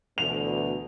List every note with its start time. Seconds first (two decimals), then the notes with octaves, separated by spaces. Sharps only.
0.18 D2 B2 E3 F7